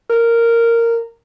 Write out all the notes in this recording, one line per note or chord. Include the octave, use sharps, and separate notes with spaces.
A#4